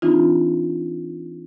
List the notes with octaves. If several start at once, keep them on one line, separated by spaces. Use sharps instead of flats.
E3 C4 D4 D#4 F4